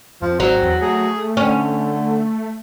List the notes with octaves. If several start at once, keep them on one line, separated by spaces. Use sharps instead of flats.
F2 F3
G#1 F#3 C4
E2
A3 G#4
D3 C#4